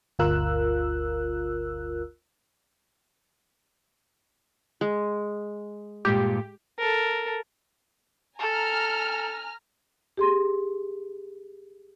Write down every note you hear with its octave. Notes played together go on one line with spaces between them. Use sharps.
G1 D2 F4 A#4 E6 F#6
G#3
G2 A#2 G#3 G4
A4 A#4
A4 G#5 A#5 F6
G4 G#4 C6